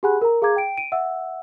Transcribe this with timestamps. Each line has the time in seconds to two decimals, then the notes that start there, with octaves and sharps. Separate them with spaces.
0.03 G4 G#4 F#5 G#5 B5 F#6
0.21 A#4 A#5
0.42 G#4 F5 A#5 D6 G#6
0.56 G5 D7
0.77 D7 D#7
0.92 E5 F#5 E6